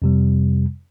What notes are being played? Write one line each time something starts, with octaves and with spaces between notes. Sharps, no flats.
F2 C3 G3